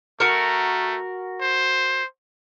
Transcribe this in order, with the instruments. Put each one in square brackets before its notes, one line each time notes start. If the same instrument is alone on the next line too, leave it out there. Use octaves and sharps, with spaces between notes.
[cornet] A3 [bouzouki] F#4 A#4
[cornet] C5